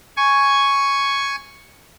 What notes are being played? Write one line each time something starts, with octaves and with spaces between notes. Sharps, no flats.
G#5 C#6